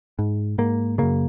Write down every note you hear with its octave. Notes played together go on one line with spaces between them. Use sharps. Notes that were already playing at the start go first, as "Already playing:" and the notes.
G#2
G#2 A#3
F#2 C#3 A#3